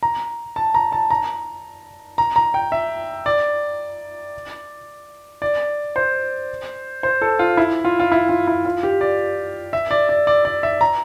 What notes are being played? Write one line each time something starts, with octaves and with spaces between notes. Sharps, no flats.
A#5
A5
A#5
A5
A#5
A#5
A#5
G5
E5
D5
D5
C5
C5
A4
F4
E4
F4
F4
E4
F4
E4
F4
G4
D5
E5
D5
D5
D5
D5
E5
A#5